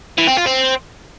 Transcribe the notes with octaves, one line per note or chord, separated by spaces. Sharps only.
E3
C4
F4
C4